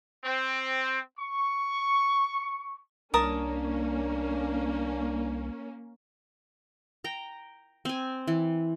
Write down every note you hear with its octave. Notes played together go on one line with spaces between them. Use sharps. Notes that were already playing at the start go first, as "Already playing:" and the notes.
C4
C#6
C2 A#3 C#4 D4 A#4 A5 D#6
G5 A#5
C4 G#5
E3